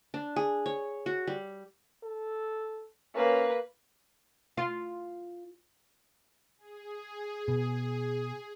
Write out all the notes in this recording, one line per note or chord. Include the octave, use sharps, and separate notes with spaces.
D4
G#4
C#5
F#4
G3
A4
A#3 C#4 B4
F4
G#4
B2